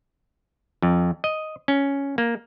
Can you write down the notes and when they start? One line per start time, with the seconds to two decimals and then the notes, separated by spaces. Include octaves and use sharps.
0.82 F2
1.24 D#5
1.68 C#4
2.18 A#3